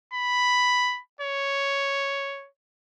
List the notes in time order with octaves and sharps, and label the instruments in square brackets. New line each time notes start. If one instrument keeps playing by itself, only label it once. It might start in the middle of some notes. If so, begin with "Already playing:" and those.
[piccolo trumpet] B5
C#5